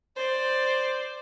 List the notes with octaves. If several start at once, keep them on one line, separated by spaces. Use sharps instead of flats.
C5 D5